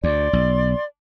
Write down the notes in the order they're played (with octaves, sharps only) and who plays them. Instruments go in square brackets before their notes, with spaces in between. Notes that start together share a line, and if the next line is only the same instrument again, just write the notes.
[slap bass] D2 [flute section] D5 C6
[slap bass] B1